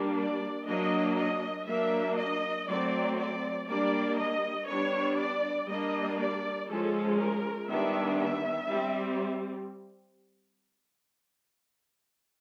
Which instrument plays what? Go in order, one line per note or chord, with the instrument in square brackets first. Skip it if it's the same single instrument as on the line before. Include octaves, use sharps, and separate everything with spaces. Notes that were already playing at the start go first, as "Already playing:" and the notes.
Already playing: [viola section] G3 A#3 D4
D5
F#3 A#3 D4 D#5
D#5
F#3 A#3 D4 E5
D#5
F#3 A3 C4 D5
D5
G3 A#3 D4 D5
D#5
G3 B3 D4 C#5
D5
G3 A#3 D4 D#5
D5
F3 G#3 C#4 A4
A#4
D#3 G3 B3 D4 E5
E5
G3 C4